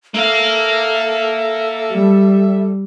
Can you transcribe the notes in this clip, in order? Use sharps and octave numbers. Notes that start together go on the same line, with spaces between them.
A#3 A4 E5 F5
G3